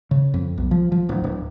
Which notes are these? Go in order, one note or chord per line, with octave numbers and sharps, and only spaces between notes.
C#3
F2
B1
F3
F3
D1
D1